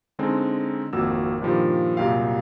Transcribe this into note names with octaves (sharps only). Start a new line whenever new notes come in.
D3 G#3 C4 C#4 D#4
G#1 F2 A#3 F#4 E6
G2 A#2 D#3 F3 G4
C2 F#2 A#2 G4 F5